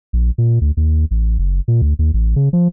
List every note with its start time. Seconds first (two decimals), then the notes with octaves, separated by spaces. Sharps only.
0.13 A#1
0.38 A#2
0.61 D2
0.77 D#2
1.11 A1
1.39 F#1
1.68 A#2
1.82 D2
1.99 D#2
2.14 A1
2.36 C#3
2.53 F3